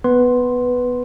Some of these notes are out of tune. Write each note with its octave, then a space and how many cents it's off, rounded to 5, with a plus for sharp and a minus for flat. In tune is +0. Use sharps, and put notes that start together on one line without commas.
B3 +5 B4 +0 C6 +0